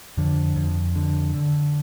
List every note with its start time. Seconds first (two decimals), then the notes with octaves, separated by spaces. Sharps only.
0.17 F2 D3
0.56 F2
0.96 D3
1.34 D3